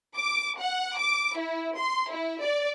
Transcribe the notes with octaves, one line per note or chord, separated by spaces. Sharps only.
D6
F#5
D6
E4
C6
E4
D5